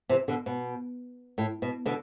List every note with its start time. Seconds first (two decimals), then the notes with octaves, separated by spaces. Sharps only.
0.09 C3 E3
0.28 B2 D3
0.46 B2
1.38 A2
1.62 B2
1.86 B2 D3